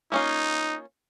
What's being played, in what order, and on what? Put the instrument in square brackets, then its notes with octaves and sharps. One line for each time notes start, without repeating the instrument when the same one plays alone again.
[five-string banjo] A#3 C#4 F4 [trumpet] D#4